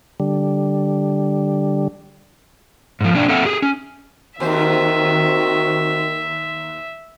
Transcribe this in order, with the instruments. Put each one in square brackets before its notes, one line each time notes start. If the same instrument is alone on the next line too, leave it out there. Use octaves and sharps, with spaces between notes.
[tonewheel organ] D3 G3
[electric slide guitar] G#2 F3
B2 A#3 D4 D5 G5
A#3 C4 A4 E5 F#5
G4 G#4
C#4
[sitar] D#2 C5 [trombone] D#3 [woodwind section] C4 F#4 [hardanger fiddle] E5